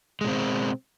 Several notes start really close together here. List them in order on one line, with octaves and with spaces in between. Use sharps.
G#3 B2 C4